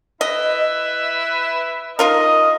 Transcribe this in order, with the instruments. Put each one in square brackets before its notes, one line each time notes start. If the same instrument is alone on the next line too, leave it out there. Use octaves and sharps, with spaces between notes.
[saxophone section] E4 B4 E5 [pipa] D#5
[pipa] D#4 F4 A#4 [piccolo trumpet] D#5